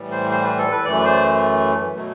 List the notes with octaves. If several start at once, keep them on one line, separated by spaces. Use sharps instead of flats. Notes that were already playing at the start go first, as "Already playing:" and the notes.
Already playing: A2 E3 G3
C5
C5
B4
A4
B4
F#2 E3 A3 D5
B4
C5
B2 F#3 A3